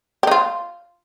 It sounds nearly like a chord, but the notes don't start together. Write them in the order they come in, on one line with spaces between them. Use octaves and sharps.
G4 D#4 F4